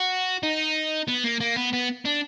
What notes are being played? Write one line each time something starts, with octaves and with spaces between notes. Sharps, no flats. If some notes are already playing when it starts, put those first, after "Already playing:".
Already playing: F#4
D#4
B3
A#3
A#3
B3
B3
D4